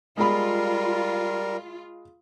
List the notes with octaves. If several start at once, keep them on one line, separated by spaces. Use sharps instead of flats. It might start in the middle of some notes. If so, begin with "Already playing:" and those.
G3 G#3 F4 A#4 B5